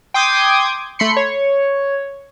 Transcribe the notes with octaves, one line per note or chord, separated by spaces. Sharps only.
G5 C6 D6 D#6 G6 G#6
A3 B5 C6 C#7
C#5